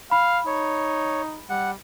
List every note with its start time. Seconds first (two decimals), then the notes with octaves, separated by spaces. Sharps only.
0.11 F5 B5
0.46 D#4 C#5
1.50 G3 F#5